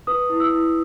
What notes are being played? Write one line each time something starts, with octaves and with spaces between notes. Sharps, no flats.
B4 D#6
E4
E6
E4